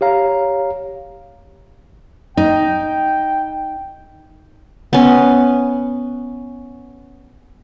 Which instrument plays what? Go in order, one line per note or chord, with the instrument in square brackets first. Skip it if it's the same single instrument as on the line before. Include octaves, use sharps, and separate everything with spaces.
[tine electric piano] G4 C#5 F5 A#5
[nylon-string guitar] D#4 [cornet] G5
[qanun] B3 C#4